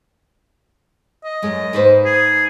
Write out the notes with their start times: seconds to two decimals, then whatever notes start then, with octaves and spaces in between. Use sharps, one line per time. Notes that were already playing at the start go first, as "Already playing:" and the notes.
1.24 D#5
1.42 F#2 G#3
1.73 G#2 B4 C5
2.05 G#4